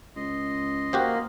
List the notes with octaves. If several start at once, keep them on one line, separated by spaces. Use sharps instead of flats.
C#2 D#5 C6
A#3 F#4 G4 C5